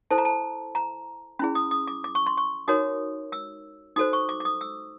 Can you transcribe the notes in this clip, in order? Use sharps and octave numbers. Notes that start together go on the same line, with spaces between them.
E4 A4 C5 A5
A#5
A5
A#5
C#4 E4 G#4 B5
D#6
D#6
D6
D6
C#6
C6
C#6
D#4 F#4 A#4 C#5 D#6
E6
D#4 F#4 A4 C5 D#6
C#6
D6
D6
D#6
E6